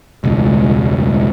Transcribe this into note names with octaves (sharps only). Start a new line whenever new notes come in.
E1 C#2